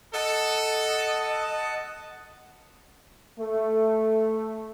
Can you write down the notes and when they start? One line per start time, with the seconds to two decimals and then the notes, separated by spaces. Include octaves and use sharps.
0.14 A4 D#5 F#5 A5
3.39 A3